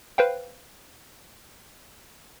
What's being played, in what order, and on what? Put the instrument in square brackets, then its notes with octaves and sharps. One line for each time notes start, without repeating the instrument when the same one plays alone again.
[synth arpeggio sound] B4 C5 F5 G5